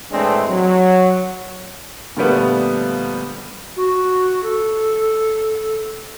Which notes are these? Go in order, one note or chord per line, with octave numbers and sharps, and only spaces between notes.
A2 E3 G#3 A3 C4 D4
F#3
A#2 D3 F3 G3 A3 B3
F#4
A4